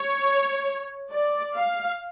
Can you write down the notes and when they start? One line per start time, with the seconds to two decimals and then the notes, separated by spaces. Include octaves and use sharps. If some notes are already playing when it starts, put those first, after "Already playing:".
Already playing: C#5
1.13 D5
1.56 F5